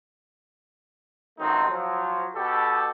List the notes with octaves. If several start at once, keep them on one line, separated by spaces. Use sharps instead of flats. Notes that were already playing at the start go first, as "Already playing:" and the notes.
C#2 D#3 F#3 A3 C4 D#4
F3 F#3
B2 G4 A4